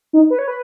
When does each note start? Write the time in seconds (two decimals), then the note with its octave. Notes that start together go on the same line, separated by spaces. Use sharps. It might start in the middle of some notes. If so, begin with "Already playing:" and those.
0.13 D#4
0.30 B4
0.39 C#5
0.48 B4